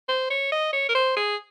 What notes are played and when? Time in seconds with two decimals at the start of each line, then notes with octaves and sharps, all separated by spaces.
0.09 C5
0.30 C#5
0.52 D#5
0.73 C#5
0.89 A#4
0.95 C5
1.16 G#4